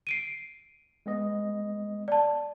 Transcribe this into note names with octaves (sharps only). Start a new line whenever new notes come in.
C7 D7 D#7
G#3 B3 D#5
D5 A5